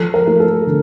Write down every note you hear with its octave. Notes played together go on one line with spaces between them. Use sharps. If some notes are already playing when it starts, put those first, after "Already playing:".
Already playing: F3 A4
A#4
A3
A4
D3